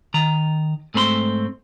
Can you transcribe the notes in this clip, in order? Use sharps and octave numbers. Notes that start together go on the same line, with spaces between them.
D#3 A#5
G#2 A3 C4 B5 C6